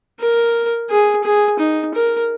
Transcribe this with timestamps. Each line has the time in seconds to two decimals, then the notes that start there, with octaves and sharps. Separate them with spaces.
0.20 A#4
0.90 G#4
1.24 G#4
1.59 D#4
1.94 A#4